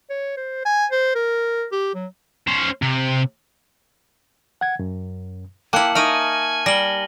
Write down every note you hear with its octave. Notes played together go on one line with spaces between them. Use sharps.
C#5
C5
G#5
C5
A#4
G4
F#3
C#4 C5
C3
F#5 G#6
F#2
A#3 E4 G5 A5 D6 F#6 C#7 F#7
D#4 A#4 D#5 E5 G#5 C#6 F6 D#7
G3 A#6 F#7 G7